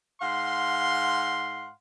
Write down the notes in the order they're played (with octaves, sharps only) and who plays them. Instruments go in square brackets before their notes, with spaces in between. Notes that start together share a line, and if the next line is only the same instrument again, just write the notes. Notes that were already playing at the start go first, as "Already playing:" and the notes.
[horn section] G#2 F5 F#5 C6